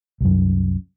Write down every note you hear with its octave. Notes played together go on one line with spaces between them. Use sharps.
C2 F#2